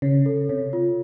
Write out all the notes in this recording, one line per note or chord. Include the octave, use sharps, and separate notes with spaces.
C#3 C#5
A4
C3 C#5
F4